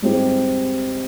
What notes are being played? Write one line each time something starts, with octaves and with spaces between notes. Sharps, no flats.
G#2 G3 C4 G4